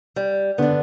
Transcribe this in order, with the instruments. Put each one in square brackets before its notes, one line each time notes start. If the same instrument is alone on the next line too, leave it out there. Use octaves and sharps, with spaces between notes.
[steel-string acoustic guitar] G3
[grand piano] D3 [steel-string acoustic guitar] B3 D4